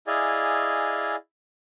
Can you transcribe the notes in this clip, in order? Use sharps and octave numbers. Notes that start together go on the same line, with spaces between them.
E4 G#4 D5 D#5 F5 G#5